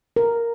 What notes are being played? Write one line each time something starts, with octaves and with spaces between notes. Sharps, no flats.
A#4